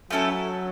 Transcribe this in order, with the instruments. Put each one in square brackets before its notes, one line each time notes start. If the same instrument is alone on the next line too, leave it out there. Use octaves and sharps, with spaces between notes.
[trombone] F#3 [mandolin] A3 C#4 E4 A4